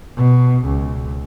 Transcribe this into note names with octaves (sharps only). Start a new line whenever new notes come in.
B2
C#2